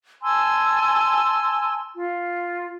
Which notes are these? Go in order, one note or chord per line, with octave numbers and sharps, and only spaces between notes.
G#5 A5 C6 E6
F4